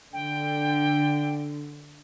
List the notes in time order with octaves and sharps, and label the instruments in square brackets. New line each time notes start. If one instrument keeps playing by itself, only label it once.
[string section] D3 [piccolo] G5